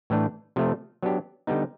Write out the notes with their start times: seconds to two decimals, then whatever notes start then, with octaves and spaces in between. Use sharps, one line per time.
0.10 A2 E3 A3 D4
0.56 C3 F3 A3
1.02 F#3 B3 D4 G4
1.47 D3 G3 B3 D#4